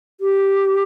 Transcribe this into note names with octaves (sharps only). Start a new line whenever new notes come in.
G4